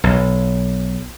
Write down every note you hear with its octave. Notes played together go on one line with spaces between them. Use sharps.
B1